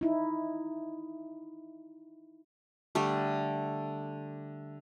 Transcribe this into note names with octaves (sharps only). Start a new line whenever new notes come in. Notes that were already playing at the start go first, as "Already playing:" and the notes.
D#4 E4
D3 G3 A3